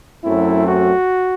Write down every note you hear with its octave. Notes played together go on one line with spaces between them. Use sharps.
F#2 F#3 A3 C4 E4
F#4